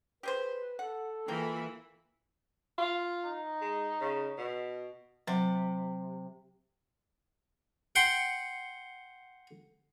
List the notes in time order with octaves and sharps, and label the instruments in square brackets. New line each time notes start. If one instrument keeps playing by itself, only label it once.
[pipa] G4 G#4 C5 [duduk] B4
[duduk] A4 [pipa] F#5
[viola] E3 [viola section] A#3 F4 B5 [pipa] G#4 A#4 G5
[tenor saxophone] F4
[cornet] D#4
[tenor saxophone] G#3
C#3
B2
[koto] C3 [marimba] F#3
[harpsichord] F#5 G5 C6